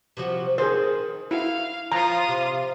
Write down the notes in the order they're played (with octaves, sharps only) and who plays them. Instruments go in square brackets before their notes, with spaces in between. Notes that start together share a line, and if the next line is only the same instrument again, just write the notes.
[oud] C3 F3 F#4
[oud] D#3 [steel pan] G#4 C5
[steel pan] E4 [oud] F#4 [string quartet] F5
[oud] F3 [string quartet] F4 D#6 [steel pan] A#5
[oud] C3